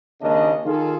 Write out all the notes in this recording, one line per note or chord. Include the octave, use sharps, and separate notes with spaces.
G#1 D#2 C#3 D4 A#4 D#5
D#3 F4 G#4 A4